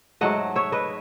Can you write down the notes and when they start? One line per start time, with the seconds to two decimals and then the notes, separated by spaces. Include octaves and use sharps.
0.21 G#2 F#3 A3 D#5 F#5
0.56 C#5 E5
0.72 B4 D#5